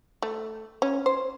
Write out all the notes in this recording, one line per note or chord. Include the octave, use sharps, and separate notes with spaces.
A3
C#4
C5